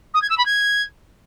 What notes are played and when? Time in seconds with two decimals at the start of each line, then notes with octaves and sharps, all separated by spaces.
0.14 D#6
0.22 G#6
0.30 E6
0.38 B5
0.45 G#6